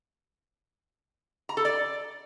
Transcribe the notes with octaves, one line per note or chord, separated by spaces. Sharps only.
A#5
A4
D5